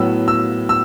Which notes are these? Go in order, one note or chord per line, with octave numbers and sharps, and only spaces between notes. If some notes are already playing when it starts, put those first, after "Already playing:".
Already playing: A2 F#3 B3 E6
E6
E6